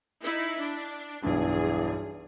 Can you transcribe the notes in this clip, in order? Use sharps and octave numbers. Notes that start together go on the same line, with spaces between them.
D#4 E4
D4
B1 E2 G2 G#4